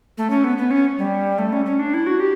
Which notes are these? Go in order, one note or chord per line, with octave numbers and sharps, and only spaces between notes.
A3
C#4
B3
B3
C#4
G3
A3
C#4
C#4
D4
E4
F#4
G4